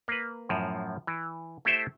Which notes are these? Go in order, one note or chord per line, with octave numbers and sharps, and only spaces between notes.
A#3 B4
F#2 A2 F3
E3
A3 E4 G4 A4 C5 E5